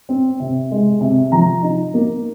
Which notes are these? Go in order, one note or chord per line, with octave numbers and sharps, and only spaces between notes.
C4
C3
G#3
C3
F3 A#5
D#4
A#3